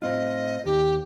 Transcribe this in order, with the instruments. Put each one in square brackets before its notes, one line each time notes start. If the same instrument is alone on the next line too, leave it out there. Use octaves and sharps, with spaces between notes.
[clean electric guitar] A2 C4 F4 [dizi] D#5
[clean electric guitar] D#2 [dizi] G4